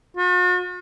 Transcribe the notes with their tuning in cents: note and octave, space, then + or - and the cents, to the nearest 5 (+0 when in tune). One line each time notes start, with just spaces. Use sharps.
F#4 -45